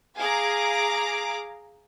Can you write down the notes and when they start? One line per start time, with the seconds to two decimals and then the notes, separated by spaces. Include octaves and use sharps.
0.18 G#4 F5 A#5 D6